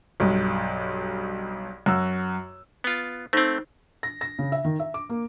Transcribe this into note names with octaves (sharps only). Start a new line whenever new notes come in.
B1 G2
F#2 F#4 E6
B3 F4
A3 C4 D#4 C5
A#6
A#6
C#3
E5
D#3
E5
D6
A#3